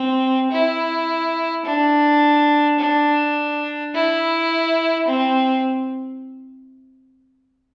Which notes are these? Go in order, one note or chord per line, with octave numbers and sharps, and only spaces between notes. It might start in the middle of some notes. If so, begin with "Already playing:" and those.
Already playing: C4
E4
D4
D4
E4
C4